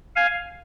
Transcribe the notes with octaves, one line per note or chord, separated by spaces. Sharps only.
F5 G#5